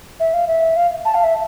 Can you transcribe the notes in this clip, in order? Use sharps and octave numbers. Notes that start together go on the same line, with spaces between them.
E5
F5
E5
F5
A5
F5
E5